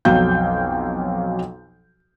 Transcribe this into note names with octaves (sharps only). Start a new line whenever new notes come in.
B1 F2 F#3 F5 G5 G6